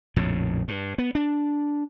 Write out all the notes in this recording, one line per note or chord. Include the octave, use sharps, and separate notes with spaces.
A#1 F2 A2 C#3
G2
B3
D4